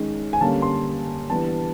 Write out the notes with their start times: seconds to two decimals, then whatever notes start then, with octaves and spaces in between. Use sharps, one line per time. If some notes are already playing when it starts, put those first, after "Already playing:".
Already playing: D#3 G#3 C#4
0.33 G#5
0.41 D3 G3 A#3 C#4 A5
0.62 C6
1.30 E3 G3 B3 D4 A5